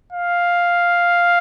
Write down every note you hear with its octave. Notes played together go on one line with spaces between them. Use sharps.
F5